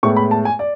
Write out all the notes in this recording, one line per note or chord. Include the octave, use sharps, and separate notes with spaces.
A2 G#3 B3 E4 C#6
B5
A5
G#5
D5